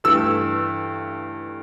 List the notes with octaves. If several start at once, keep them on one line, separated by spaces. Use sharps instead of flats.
G2 E3 A3 E6